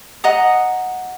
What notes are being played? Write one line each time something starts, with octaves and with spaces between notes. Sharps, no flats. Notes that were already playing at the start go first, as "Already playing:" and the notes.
D#5 F#5 A#5 D#6